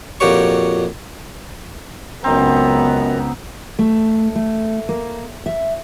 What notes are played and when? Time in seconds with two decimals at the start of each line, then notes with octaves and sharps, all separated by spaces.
0.20 F2 A#2 F#4 G4 C#5 C#6
2.24 C#2 F#2 B3 C4 D#4 A#5
3.79 A3
4.35 A3
4.89 A#3
5.46 E5